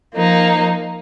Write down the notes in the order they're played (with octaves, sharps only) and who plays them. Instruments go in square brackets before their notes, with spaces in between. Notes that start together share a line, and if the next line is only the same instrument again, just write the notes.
[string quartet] F3 A#3 D#4